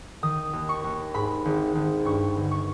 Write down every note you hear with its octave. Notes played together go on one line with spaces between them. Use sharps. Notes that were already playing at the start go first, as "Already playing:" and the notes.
D#3 D#6
D#2
C#6
D#2
G#2 B5
G#1
G#1
G2 C#6
G1
C#6